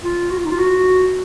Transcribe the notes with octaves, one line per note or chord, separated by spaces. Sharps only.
F4
F#4
F4
D#4
F4
F#4